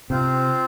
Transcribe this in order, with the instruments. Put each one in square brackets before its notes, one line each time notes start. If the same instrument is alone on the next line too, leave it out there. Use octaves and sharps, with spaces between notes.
[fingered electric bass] C3 [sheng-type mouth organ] C4 F4 C5